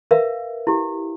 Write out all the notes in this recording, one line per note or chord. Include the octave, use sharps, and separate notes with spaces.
A#4 B4 E5 F5
E4 G4